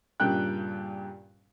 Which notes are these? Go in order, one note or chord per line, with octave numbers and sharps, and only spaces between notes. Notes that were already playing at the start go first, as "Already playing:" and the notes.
G2 A#2 C#3 G5 F#6